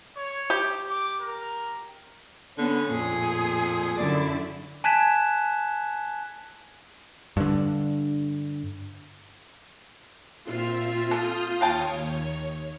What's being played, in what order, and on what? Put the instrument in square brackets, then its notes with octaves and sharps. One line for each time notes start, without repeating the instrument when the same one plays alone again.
[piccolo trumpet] C#5
[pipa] G4
[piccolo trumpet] D6
A#4
[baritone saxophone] D3 [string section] B3 C#4
[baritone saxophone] F2 [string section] A#2 [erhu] G#4
[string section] F#2 D3 E4 [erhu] D5
[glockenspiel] G#5 A5 F#6 G#6 B6 E7
[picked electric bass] G2 D3
[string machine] A#2 C4 E5 [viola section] F4
[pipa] A4 [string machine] D#6 F6 G6
[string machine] D#2 C#5 [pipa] F5 G5 A5